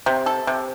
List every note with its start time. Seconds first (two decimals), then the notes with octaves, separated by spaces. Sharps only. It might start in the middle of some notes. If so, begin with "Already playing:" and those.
0.06 C3
0.26 A4
0.47 C3